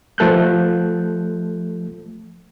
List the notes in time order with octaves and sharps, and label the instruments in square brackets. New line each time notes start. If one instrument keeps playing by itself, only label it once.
[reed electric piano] F3 A3 A4 F#6 G6